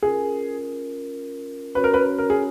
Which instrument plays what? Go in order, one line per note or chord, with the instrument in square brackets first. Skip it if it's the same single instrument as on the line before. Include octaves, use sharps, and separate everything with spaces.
[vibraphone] C#4 F4 A#4 [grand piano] G#4
[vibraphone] C#4 F#4 C#5 [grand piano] B4
[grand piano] A#4
B4
A#4
G#4